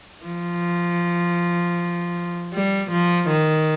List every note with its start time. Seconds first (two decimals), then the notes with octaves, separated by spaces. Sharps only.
0.25 F3
2.54 G3
2.91 F3
3.29 D#3